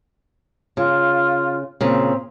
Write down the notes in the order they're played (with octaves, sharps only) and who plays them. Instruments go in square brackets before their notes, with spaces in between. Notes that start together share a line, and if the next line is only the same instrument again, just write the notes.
[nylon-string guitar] C#3 [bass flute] F4
[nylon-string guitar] A#2 C#3 [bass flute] C4